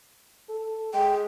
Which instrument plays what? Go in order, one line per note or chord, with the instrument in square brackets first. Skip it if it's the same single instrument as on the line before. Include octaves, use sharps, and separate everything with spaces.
[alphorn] A4
[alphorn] G#3 [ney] G5